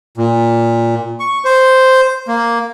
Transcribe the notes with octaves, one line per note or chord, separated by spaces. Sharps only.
A#2
C#6
C5
A#3